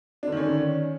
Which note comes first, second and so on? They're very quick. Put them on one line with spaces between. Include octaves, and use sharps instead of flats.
D4 D3 D#3 C#4